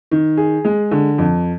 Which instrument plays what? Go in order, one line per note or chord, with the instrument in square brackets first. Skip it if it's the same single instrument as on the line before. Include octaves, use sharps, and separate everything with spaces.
[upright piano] D#3
G#4
G#3
D3
F2